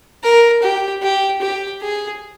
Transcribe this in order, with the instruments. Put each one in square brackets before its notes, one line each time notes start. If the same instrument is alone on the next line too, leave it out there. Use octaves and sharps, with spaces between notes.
[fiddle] A#4
G4
G4
G4
G#4